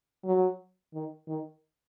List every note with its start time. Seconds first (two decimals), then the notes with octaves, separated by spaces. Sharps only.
0.24 F#3
0.94 D#3
1.28 D#3